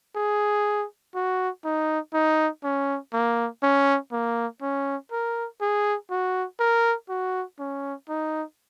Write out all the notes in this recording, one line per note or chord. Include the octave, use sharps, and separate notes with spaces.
G#4
F#4
D#4
D#4
C#4
A#3
C#4
A#3
C#4
A#4
G#4
F#4
A#4
F#4
C#4
D#4